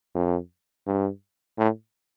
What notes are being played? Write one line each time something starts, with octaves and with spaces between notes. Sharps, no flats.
F2
G2
A2